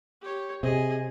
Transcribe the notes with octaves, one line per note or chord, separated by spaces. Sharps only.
G4 C#5
C3 G#4 D#5